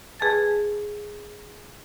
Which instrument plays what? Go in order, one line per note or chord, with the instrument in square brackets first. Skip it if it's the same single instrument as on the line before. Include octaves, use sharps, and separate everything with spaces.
[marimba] G#4 B4 G#5 A5 A6